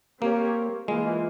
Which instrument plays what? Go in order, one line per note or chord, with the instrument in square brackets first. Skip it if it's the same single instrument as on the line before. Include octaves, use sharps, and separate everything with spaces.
[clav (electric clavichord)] A#3 [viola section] C4 G4 A#4 C#5
[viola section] E3 A#3 F4 [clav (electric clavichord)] G#3